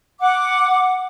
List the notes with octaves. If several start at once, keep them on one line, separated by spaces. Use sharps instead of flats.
F#5 D6